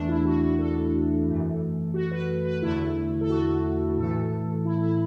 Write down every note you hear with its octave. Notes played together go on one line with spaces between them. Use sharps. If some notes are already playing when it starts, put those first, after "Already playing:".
Already playing: E2 E3 A3 D4
E4
F#4
F#4
A4
F#2 E3 A3
F#4
B4
B4
E2 D3 A3 E4
A4
F#4
A2 E3 A3 A4
E4
E4